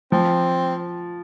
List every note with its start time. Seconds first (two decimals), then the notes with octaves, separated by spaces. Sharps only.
0.12 F3 C4